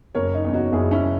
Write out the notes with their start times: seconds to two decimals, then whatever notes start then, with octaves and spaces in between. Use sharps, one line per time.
0.15 F#1 A#4 C#5
0.34 D#4
0.44 E2 C#3
0.54 D#4 F#4
0.72 F#1 E4 G#4
0.91 C#4 E4
1.04 C#3